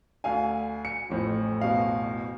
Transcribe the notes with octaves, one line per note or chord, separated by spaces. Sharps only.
D2 F5 G#5
C#7
A1 F2 A2
B2 F5